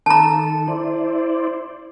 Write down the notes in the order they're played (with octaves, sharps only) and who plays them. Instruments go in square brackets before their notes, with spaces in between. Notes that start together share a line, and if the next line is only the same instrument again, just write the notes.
[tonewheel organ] D#3 A4 [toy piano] A5 A#5
[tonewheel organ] E4 C5 D5